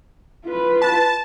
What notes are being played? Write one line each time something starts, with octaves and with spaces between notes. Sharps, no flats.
F4 B4
A5